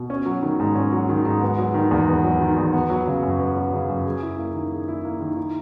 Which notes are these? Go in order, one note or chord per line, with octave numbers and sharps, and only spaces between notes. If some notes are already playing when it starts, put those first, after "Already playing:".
Already playing: B2
C#4
F#3
D#3
G#2
C#4
F#3
D#3
G#2
B3
F#3
D#3
E2
B3
F#3
D#3
E2
B3
F#3
C#3
F#2
B3
F#3
C#3
F#2
G#4
E4
A#3
D#3
G#4
E4
A#3
D#3
E4